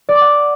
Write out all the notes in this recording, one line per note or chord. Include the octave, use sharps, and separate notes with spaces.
D5
D6
F#5